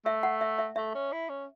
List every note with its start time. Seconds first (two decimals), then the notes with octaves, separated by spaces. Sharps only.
0.05 A3 E5
0.23 F#5
0.41 E5
0.59 E5
0.76 A3 E5
0.95 C#4
1.12 E4
1.29 C#4